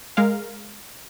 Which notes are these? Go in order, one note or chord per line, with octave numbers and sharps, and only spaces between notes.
G#3 A#4 F5